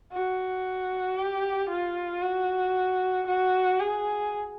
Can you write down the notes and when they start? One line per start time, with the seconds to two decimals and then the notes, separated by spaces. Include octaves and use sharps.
0.12 F#4
1.17 G4
1.70 F4
2.21 F#4
3.27 F#4
3.79 G#4